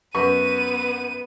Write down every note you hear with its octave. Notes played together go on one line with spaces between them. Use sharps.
F#2 B3 B4 C#6 D#7